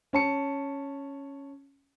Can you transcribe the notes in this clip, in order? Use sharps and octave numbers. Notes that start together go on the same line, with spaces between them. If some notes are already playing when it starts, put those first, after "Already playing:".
C#4 A5 C#7